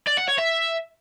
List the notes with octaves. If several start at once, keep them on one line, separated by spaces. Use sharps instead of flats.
D5
F#5
C#5
E5